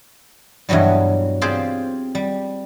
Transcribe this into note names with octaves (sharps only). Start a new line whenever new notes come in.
G2 B2 E3 F#3 G3
C4 F4 G4 G#4 C5 D5
G3